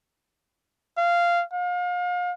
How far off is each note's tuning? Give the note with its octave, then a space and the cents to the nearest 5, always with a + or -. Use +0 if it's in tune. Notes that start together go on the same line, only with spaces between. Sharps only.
F5 -10
F5 +35